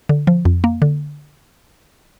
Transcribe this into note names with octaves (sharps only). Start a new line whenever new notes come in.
D3
F3
F2
A#3
D3